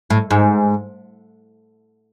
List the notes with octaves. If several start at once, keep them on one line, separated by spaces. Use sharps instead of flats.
A2
G#2